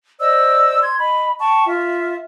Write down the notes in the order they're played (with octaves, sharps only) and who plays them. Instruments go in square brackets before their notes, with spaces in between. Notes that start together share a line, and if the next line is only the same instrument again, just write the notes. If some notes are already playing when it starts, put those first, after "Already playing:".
[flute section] C5 D5 D#5 E6
C6 G#6
D#5 B5
G5 A5 C#6
F4 E5